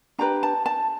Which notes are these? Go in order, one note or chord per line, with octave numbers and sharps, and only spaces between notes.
D4 G4 B4 A#5
A5
A5